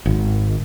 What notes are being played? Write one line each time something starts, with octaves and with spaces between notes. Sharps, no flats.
G#1